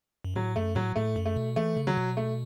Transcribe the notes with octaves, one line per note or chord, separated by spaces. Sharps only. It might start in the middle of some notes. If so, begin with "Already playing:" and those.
F#2
A2 F#3
F#2 A3
A2 F#3
A2 A3
F#2
A3
B2
E3 A3
C#3
F#3
B2
A3